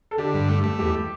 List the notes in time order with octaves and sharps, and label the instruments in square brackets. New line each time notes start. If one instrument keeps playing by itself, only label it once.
[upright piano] A4
[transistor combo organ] D3 [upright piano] G4
[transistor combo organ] G2
A3
A3
[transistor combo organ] E2 [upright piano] G4